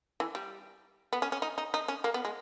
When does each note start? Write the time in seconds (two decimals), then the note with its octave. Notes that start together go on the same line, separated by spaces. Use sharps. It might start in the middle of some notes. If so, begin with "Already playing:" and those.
0.20 E3
0.35 G3
1.13 B3
1.22 C#4
1.32 C#4
1.42 D#4
1.58 D#4
1.74 D#4
1.88 C#4
2.04 A#3
2.14 B3
2.25 G#3